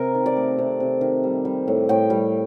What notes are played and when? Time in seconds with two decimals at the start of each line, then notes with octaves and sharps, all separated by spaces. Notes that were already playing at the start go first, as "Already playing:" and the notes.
Already playing: C3 A#4
0.15 D#3
0.26 D5
0.36 A3
0.58 C3
0.80 C3
1.01 D#3
1.24 G3
1.45 G3
1.68 A2
1.89 A2 G5
2.10 G3